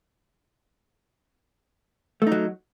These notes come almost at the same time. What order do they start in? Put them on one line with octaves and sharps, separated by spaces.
A3 D#4 F#3